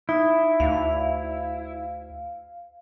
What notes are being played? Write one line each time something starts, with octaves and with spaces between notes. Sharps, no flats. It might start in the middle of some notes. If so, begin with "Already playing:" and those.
D#4 E4
D2 F5